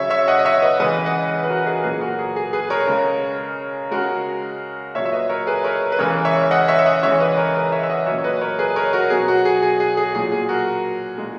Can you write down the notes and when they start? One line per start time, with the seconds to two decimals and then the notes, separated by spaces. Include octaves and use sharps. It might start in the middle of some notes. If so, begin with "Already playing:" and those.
Already playing: C#3 F#3 C#5 E5
0.10 C#5 E5
0.28 D#5 F#5
0.39 D#5
0.45 C#5 E5
0.62 B4 D#5
0.80 C#3 E3 G#3 B4 D#5
1.06 D#5 F#5
1.43 B4
1.49 F#4 A#4
1.66 G#4 B4
1.78 A#4
1.83 A#2 F#3 G#4 B4
2.01 F#4 A#4
2.19 G#4
2.36 G#4
2.53 G#4 B4
2.70 A#4 C#5
2.87 C#3 G#3
3.91 C#3 G#3 F#4 A#4
4.95 A#2 C#5 E5
4.99 F#3
5.05 E5
5.12 B4 D#5
5.29 A#4 C#5
5.47 G#4 B4
5.64 A#4 C#5
5.92 B4
5.99 C#3 E3 G#3 A#4 C#5
6.25 C#5 E5
6.51 D#5 F#5
6.68 C#5 E5
6.79 E5
6.86 D#5 F#5
7.03 C#3 E3 G#3 C#5 E5
7.20 B4 D#5
7.37 A#4 C#5
7.55 B4 D#5
7.72 C#5 E5
7.83 E5
7.89 D#5 F#5
8.06 F#3 C#5 E5
8.11 A#2
8.18 C#5
8.24 B4 D#5
8.41 A#4 C#5
8.59 G#4 B4
8.76 A#4 C#5
8.93 F#4 A#4
9.10 B2 F#3 G#4
9.28 F#4
9.45 G#4
9.62 G#4
9.80 G#4
9.97 G#4
10.15 A#2 F#3 G#4
10.32 G#4
10.49 F#4 A#4
11.18 A#2 G#3